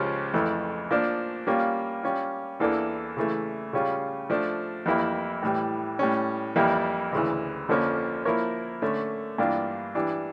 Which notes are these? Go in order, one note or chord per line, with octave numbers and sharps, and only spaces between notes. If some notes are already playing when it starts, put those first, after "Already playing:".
Already playing: C#2 C#3 F3 C#4 G4
F2 E3 A3
F3 A#3 D4
G3 A#3 C#4 F4
G3 C#4 F4
E2 E3 A#3 D4 A4
C#3 E3 A3
C#3 G3 C#4 F4
F3 A3 D4
F2 E3 G3 A#3 E4
A2 E3 G3
A2 G3 C#4
F2 E3 G3 A#3 E4
D2 C#3 E3
F2 D3 F3 A#3 C#4
F3 A#3 E4 A#4 C#5
D3 A3 C#4
G2 E3 A#3 D4 F4
E3 G3 D4